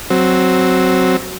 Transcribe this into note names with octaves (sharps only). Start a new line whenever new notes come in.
F#3 C4